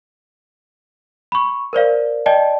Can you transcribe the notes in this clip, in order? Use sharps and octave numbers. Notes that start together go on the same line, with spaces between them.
B5 C#6
A#4 C5 D5 F5
D5 D#5 G5 A5